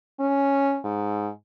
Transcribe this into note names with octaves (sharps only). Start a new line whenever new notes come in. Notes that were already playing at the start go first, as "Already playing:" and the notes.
C#4
G#2